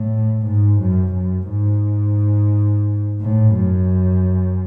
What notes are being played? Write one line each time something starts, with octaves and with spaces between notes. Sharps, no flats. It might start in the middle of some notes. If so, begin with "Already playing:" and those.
Already playing: A2
G#2
F#2
F#2
G#2
A2
F#2